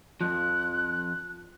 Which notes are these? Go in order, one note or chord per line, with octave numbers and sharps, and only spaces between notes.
F2 F3 F#6